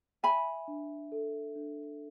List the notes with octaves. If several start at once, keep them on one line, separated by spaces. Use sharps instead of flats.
E5 G#5 B5
D4
A4
D4